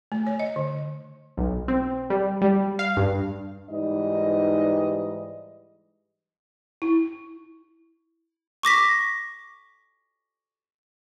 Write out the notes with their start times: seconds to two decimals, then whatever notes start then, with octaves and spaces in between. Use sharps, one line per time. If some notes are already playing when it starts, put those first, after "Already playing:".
0.12 A3
0.27 C#5
0.40 D#5
0.56 D3
1.37 B1
1.68 C4
2.10 G3
2.42 G3
2.79 F5
2.97 G2
3.69 G#2 E3 G3 D#4 B4 D#5
6.82 E4
8.63 C#6 D6 A#6 B6